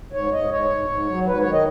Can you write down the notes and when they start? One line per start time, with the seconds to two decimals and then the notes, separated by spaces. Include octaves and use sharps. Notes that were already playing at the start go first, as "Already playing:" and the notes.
0.13 G#2 C#5
0.32 G#2 D#5
0.51 G#2 C#5
0.70 G#2
0.89 G#2
1.09 F#3
1.26 G#2 B4
1.39 C#5
1.46 D#3
1.52 D#5